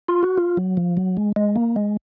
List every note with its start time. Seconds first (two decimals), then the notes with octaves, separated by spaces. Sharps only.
0.08 F4
0.23 F#4
0.38 F4
0.57 F#3
0.77 F3
0.97 F#3
1.17 G#3
1.36 G#3
1.56 A#3
1.76 G#3